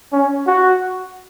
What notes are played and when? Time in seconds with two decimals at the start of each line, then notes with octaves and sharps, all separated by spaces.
0.13 C#4
0.47 F#4